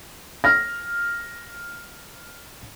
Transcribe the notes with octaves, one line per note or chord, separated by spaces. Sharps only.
F6 A#6